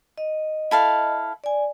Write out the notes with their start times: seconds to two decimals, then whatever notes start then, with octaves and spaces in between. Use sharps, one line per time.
0.18 D#5
0.71 E4 A4 F5
1.44 D5 G#5